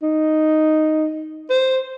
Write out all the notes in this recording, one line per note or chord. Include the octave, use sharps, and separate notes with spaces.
D#4
C5